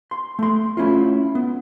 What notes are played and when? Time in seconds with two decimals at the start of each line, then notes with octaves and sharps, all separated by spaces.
0.11 C6
0.39 A3 C6
0.77 A3 C#4 E4 F4
1.35 B3